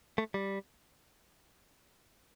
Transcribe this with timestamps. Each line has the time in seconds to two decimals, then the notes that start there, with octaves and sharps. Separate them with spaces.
0.18 A3
0.34 G3